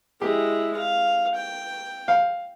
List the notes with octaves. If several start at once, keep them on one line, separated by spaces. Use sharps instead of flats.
G#3 E4 G4
F5
G5
F5